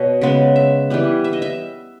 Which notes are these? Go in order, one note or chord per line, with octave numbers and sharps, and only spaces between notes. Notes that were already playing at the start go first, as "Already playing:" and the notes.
Already playing: B2 C#5 D#5
C#3 G#3 B3
E5
E3 G3 B3
E5
D#5
E5